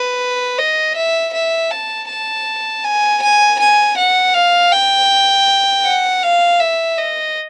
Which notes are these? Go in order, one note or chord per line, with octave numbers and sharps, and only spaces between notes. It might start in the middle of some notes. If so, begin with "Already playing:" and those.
Already playing: B4
D#5
E5
E5
A5
A5
G#5
G#5
G#5
F#5
F5
G5
F#5
F5
E5
D#5